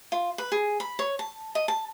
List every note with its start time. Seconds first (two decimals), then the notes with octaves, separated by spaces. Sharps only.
0.12 F4
0.38 B4
0.52 G#4
0.80 B5
0.99 C#5
1.19 A5
1.55 D#5
1.68 A5